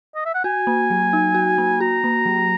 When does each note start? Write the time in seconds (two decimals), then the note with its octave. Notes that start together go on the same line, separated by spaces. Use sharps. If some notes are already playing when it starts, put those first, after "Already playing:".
0.15 D#5
0.25 E5
0.34 F#5
0.44 F#4 G#5
0.67 A#3
0.90 F#3
1.13 D#4
1.35 F#4
1.58 A#3
1.80 F#4 A#5
2.04 A#3
2.26 F#3